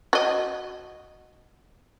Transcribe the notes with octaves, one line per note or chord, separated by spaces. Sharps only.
F#4 D#5